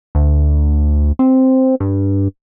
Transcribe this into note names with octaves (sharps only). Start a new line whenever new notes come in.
D2
C4
G2